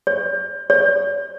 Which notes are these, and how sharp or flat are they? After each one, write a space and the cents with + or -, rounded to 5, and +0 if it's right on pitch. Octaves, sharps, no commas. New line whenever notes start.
C#5 +40
C#5 +45